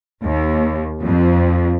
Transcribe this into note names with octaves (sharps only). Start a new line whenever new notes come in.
D#2
F2